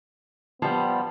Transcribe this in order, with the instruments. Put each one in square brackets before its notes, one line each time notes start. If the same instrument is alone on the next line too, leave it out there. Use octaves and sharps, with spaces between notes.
[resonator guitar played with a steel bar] F3 G3 [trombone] B3 [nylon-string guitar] A5